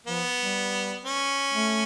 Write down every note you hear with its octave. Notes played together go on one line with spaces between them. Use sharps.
F3 B3
G3
C#4
A3